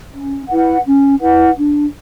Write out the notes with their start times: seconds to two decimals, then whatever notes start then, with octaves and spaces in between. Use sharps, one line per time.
0.14 C#4
0.49 E4 B4 F#5
0.86 C#4
1.20 E4 B4 F#5
1.56 D4